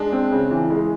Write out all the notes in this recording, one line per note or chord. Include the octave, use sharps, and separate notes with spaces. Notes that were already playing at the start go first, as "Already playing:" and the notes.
Already playing: G#3 D4
C4
C#3
E3
G#3